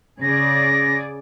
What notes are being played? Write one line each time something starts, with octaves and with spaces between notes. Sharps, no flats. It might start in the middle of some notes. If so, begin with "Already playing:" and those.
C#3 G#4 D5 A#6